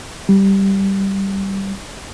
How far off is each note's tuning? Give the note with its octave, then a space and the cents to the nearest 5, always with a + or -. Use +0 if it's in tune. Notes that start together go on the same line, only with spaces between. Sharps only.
G3 -5